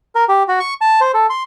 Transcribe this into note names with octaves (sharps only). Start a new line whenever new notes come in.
A#4
G4
F#4
C#6
A5
C5
A4
C6